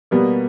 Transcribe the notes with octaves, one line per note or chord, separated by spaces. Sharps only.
B2 G3 A#3 B3